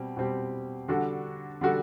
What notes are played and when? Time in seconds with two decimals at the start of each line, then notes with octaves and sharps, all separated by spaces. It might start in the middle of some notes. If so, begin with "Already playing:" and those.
Already playing: B2 G3 C4 G4
0.17 B2 G3 C4 G4
0.88 D3 G3 D4 F#4 A4
1.61 D3 G3 D4 F#4 A4